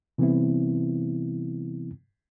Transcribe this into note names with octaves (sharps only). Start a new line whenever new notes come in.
C3 E3 G3 B3 C4 E4